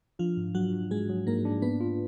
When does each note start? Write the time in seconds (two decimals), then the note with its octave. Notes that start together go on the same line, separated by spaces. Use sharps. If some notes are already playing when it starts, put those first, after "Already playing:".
0.19 F3 D4 F4
0.37 G#2
0.55 F#3 D4 F#4
0.73 D4
0.91 G#2 G#3 G#4
1.09 F#3
1.26 G#2 A#3 A#4
1.45 D4
1.62 A#3 B3 B4
1.81 F4